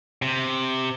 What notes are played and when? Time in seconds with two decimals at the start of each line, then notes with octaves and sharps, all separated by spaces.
0.22 C3